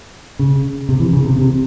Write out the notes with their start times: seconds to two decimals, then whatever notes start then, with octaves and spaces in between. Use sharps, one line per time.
0.39 C#3
0.89 C3
1.00 E3
1.13 C#3
1.25 C3
1.38 C3